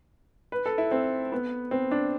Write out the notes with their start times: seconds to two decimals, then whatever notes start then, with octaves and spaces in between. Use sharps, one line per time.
0.52 B4
0.66 A4
0.78 E4
0.91 C4
1.32 B3
1.71 C4
1.91 D4